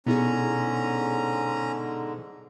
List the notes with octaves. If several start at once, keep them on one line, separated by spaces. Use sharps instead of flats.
G#2 B2 D3 B3 C#4 E4 G#4 A#5